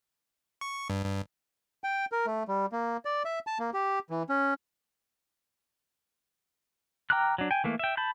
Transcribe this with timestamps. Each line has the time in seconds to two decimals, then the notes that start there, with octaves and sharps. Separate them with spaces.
0.61 C#6
0.90 G2
1.05 G2
1.84 G5
2.12 A#4
2.26 A3
2.48 G3
2.72 A#3
3.05 D5
3.25 E5
3.47 A5
3.60 A#3
3.74 G4
4.10 E3
4.29 C#4
7.10 G5 A#5 D6 F6 F#6
7.38 F#3 D4
7.51 G5 G#5
7.64 E3 A3 A#3
7.79 E5 G5
7.97 A5 B5 G6